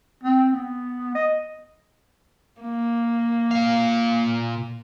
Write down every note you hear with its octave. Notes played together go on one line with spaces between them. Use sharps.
C4
B3
D#5
A#3
A#2 F5